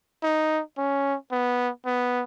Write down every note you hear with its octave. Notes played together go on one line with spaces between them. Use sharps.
D#4
C#4
B3
B3